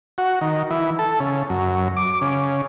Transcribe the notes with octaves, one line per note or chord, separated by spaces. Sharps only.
F#4
D#3
E3
A4
C#3
F#2
D6
C#3